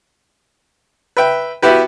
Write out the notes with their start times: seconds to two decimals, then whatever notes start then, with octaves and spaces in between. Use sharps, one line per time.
1.17 B4 E5 G5
1.62 B3 E4 F#4 G4 B4